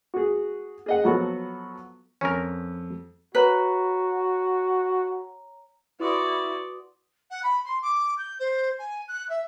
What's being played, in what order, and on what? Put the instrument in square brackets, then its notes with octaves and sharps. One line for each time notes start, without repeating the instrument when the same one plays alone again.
[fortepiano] F#4 G#4
G#4 D#5 F#5
F3 F#3 B3 F#4 A4
[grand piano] F2 [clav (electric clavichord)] C#4 A#4
[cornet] F#4 [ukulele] B4 [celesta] C#5 A#5
[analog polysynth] E4 [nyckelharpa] F#4 D5 [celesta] B4 C6 D#6
[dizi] F#5
B5
C6
D6
G6
C5
G#5
F#6
E5